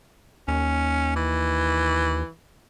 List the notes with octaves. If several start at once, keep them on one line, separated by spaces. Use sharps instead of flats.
D#2 C#4
E3